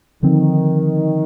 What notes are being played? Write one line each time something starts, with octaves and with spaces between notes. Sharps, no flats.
D3 D#3 F3 C4